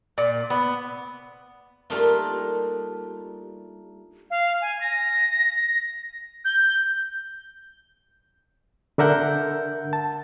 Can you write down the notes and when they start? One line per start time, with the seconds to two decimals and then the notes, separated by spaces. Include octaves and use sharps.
0.18 A#2
0.50 B3
1.90 G3 A3 A#3 D4 D#4 F4
4.30 F5
4.61 G#5
4.81 A#6
6.45 G6
8.98 D3 D4 A#4 E5 F#5 G6
9.93 A5